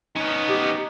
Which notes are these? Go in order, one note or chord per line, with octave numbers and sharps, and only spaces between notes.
B3 C#4 D#4
G4